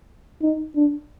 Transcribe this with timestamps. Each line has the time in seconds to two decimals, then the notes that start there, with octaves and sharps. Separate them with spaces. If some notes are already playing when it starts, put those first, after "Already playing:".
0.42 D#4
0.76 D4